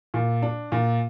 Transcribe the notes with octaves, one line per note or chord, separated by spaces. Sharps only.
A#2
D4
A#2